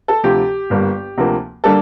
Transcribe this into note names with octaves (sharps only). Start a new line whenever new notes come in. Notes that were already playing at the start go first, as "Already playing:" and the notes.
A4
D2 C3 F3 G4
G1 G2 D3 G3 A#3
D2 C3 F3 A#3
D3 G3 A#3 A4